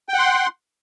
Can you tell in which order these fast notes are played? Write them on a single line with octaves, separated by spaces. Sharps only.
G5 F#5 C6